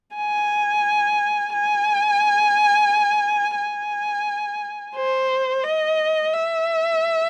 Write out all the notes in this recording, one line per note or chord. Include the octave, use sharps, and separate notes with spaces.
G#5
G#5
G#5
C5
D#5
E5